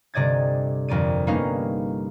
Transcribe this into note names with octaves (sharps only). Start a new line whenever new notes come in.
G1 C3 D5 D#5 G#6 A6
G1 F2 A#4 D5 D#7
G3 A#3 B3 C#4 D#4 F5